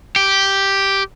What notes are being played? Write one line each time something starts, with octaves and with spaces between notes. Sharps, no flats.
G4